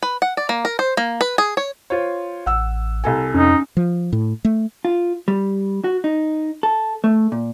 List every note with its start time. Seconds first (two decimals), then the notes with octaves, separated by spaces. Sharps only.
0.02 B4
0.22 F#5
0.37 D5
0.49 A#3
0.65 A#4
0.79 C5
0.97 A#3
1.21 B4
1.38 G#4
1.57 C#5
1.90 F4 C5 C#5
2.46 A1 F#5 E6
3.04 C2 A4 G#5
3.34 F2 C#4 D#4
3.77 F3
4.13 A2
4.45 A3
4.85 F4
5.28 G3
5.84 F#4
6.04 D#4
6.63 A4
7.04 A3
7.32 A#2